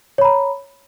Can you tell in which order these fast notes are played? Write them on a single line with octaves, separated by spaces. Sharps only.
C#5 B5 A#5